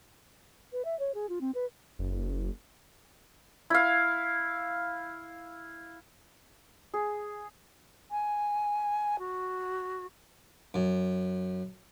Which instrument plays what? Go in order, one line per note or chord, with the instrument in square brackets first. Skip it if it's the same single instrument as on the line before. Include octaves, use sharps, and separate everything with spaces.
[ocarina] B4
E5
C#5
G#4
F4
C4
B4
[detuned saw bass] F#1
[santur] E4 F5
G#4
[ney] G#5
F#4
[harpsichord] F#2